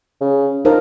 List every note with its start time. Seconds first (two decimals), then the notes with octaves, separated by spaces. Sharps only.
0.21 C#3
0.65 F3 D#4 A#4